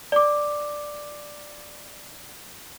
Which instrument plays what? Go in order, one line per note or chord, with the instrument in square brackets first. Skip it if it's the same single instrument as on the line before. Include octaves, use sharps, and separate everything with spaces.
[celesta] D5 D6